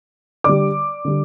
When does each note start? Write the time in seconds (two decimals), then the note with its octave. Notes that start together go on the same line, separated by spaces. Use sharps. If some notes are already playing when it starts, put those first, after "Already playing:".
0.44 D3 G3 D5 D6
1.05 D3 G3